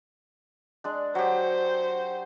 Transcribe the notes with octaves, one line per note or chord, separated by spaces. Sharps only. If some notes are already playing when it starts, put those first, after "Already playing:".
G#3 D4
F#3 G4 C5